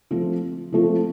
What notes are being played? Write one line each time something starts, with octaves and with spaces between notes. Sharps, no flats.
F3 A3 C4 F4
F3 A3 C4 F4